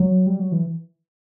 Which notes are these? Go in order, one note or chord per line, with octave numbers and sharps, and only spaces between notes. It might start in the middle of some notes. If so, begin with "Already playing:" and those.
Already playing: F#3
G3
F#3
E3